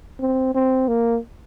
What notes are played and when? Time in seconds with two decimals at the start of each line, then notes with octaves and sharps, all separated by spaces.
0.20 C4
0.55 C4
0.88 A#3